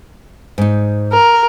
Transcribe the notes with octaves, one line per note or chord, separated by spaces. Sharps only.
G#2 D#4
A#4